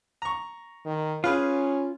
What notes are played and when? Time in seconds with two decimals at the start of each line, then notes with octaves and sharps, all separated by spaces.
0.22 A#5 C#6
0.86 D#3
1.24 C#4 F4 G#4 B4 F5